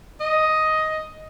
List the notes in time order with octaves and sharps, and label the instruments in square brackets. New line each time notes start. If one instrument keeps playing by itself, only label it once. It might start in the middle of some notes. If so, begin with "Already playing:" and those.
[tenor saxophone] D#5